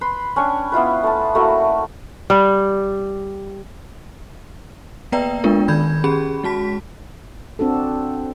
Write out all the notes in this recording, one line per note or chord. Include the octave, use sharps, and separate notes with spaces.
B4 B5 C6
C#4 D4 G5 C#6
B3 E4 F4 B4
A3 A5
A3 A#3 E4 F#4
G3
A#3 B3 B4 D5 G5 A#5
G#3 B3 D4 F4 A#4
D#3 B5 G6 G#6
C#4 G4 G#4 B5
G#3 F#4 A5 B6
C4 D4 F#4 A4